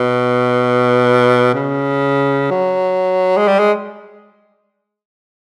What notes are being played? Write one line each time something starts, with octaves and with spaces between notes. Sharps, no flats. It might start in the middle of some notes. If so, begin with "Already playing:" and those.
Already playing: B2
C#3
F#3
G#3
G3
G#3